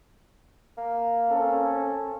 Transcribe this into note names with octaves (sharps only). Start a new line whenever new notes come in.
A#3
C4 C#4 A4